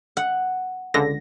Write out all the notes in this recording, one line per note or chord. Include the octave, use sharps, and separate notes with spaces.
F#5
C#2 D3 A#6